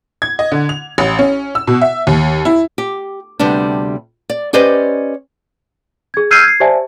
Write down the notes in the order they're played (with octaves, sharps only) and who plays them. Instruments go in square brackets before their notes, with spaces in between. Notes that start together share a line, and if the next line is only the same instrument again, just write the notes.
[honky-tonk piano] G#6
D#5
D3
F7
A1
C#4
E6
B2
E5
D#2
E4
[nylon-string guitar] G4
D2 C3 G3 B3 D4
D5
C#4 G4 B4 C5 D5 D#5
[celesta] G#4 G#6
E6 F6 G6 G#6 C7 D#7
G#6 C7
G4 C5 D5 E5 G#5 A5